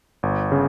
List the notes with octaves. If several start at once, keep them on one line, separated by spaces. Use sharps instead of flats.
G1
C#3